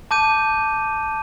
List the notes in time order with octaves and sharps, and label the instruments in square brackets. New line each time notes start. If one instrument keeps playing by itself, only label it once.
[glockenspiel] A5 D6 G6 D#7